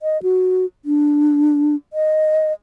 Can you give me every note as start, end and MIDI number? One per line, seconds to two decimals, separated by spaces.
0.02 0.21 75
0.23 0.66 66
0.85 1.75 62
1.93 2.53 75